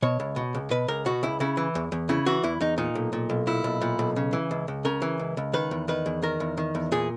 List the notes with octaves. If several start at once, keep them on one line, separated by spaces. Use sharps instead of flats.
B2 C#5
C#2
B2
C#2
B2 B4
C#2 A#4
B2 F#4
C#2 E4
C#3 E4
E3
E2
E2
C#3 E4
E3 F#4
E2 E4
E2 D#4
A#2 D#4
B1
A#2
B1
A#2 E4
B1
A#2
B1
C#3
E3
C#2
C#2
C#3 A#4
E3
C#2
C#2
D#3 B4
E2
D#3 B4
E2
D#3 A#4
E2
D#3
E2
A#2 G#4